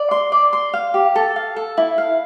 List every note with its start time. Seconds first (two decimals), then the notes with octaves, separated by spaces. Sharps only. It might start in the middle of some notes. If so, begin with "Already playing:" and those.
Already playing: D5
0.11 C6
0.32 D5
0.53 C6
0.74 F5
0.94 G4
1.16 A4
1.36 F5
1.56 A4
1.78 E4
1.98 F5